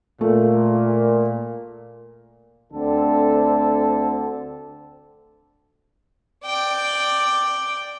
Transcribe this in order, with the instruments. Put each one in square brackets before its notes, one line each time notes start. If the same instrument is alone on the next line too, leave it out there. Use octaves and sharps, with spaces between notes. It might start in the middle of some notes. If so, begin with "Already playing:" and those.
[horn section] A#2 [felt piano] A3
[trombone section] D2 D3 C4 A4
[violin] D5 G5